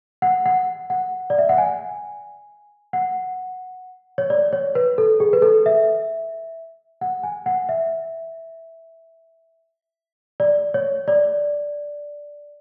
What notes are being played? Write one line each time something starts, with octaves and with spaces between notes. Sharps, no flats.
F#5
F#5
F#5
D5
E5
F#5
G#5
F#5
C#5
D5
C#5
B4
A4
G#4
B4
A4
E5
F#5
G#5
F#5
E5
D5
C#5
D5